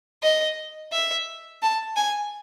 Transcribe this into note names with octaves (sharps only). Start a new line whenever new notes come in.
D#5
E5
A5
G#5